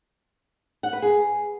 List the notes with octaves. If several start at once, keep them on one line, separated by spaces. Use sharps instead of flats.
F#5
B4
G#4